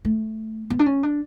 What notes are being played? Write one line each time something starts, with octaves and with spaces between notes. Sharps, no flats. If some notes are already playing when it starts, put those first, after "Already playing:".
A3
B3
D4
C#4
D4